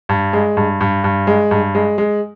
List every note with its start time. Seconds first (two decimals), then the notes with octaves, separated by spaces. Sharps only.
0.09 G2
0.33 G#3
0.57 G2
0.81 G2
1.04 G2
1.27 G#3
1.51 G2
1.75 G#3
1.98 G#3